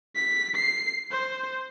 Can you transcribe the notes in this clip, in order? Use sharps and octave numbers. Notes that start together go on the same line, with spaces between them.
B6
C7
C5